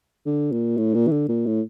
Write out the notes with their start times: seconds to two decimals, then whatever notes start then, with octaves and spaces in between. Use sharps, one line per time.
0.26 D3
0.52 A#2
0.77 A2
0.94 A#2
1.07 E3
1.11 D3
1.29 A#2
1.46 A2